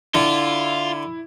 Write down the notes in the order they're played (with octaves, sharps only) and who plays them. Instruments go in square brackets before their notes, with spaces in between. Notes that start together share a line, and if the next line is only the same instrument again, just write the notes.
[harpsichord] D3 [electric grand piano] E4 [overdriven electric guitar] F4